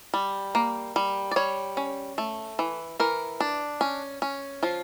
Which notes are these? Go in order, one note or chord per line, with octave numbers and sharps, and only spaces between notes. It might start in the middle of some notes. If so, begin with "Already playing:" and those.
G3
A#3
G3
D5
G3 C#5
C#4
A3
E3
E3 A#4
D4
C#4
C#4
F3 F4